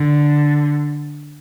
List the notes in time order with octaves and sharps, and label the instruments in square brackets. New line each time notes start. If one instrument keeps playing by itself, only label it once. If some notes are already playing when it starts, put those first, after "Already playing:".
Already playing: [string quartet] D3